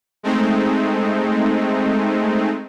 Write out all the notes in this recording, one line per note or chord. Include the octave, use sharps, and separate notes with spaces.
G#3 A3 C4 D#4